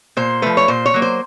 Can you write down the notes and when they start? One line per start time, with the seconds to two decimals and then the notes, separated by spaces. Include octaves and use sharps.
0.17 A#2 C5
0.42 F3 A3 B4
0.57 C#5
0.68 A#2 C5
0.86 C#5
0.94 F#3 A#3
1.02 C5